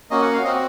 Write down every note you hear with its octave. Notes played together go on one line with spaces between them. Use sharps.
A#3 C#4 F#4 D#5
F#5
F5
C4 F#4 D#5